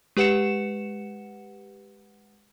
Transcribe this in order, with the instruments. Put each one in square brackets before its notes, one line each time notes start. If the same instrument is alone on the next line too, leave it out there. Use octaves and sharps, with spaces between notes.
[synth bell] G#3 G4 B4 F#5 C#7 E7